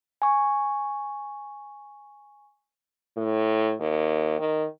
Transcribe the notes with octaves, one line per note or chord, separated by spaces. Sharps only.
G#5 C#6
A2
D#2
D#3